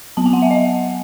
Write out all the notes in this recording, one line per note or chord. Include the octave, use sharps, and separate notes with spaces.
F#3 B3 A5
G#5
F#5
E5
D#5